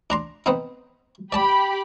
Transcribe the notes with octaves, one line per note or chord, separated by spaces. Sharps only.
D4 A#5 C6
B3 C4 D#4
G4 D5 A5 B5 D6